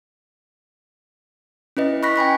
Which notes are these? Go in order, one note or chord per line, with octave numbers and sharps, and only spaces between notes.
C#4 E4 B4 D#5
B5 C#6 F#6 A#6 B6
G5 G#5 B5 C#6